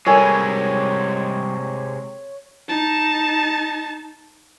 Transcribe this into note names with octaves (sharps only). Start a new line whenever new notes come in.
C3 G3 G#3 A4 A#4 C#5 G#5
D#4 A5